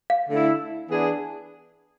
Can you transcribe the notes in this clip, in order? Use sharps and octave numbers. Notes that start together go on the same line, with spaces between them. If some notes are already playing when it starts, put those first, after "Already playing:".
F5
D3 A3 E4
E3 B3 D4 G#4